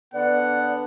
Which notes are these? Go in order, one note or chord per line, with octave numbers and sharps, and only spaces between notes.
D3 B3 D5 F#5